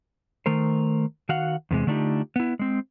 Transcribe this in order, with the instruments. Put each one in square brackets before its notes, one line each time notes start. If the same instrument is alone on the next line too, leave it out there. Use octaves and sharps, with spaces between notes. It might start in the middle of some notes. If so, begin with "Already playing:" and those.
[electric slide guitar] D#3 A3 A#4 C5
D#3 F#4 F5 F#5
E2 C3 G#3
D3 A3 D4 D#4 F4 G4
B3 E4
G#3 C4